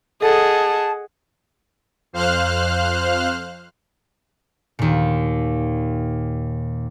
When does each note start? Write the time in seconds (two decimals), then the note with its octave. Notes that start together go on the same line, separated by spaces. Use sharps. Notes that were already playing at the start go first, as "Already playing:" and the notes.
0.22 G#4 A4 D#5 F#5 A5
2.13 F2 C5 F5 F6 F#6
4.79 D#2 A#2